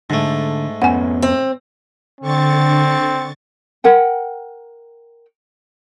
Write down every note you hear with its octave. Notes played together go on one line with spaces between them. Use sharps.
G#2 D3 A3
F2 B3 C#4 F#5 G#5
C4
D3 C4 C#6 A6
A#4 F#5 G5